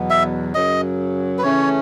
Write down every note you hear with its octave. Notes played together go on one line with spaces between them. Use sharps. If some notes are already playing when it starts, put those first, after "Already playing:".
Already playing: E2 B2 F#3 B3
E5
F#2 C#3 F#3 D#5
B4
C#3 E3 A3 C#4 C#5